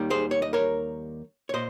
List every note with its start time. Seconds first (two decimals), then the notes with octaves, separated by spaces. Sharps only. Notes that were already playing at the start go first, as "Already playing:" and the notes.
Already playing: D#2 D#3 G3
0.10 G#4 C5
0.31 C#5
0.42 D#5
0.53 A#4 C#5
1.49 C#5
1.53 A#2 C5 D#5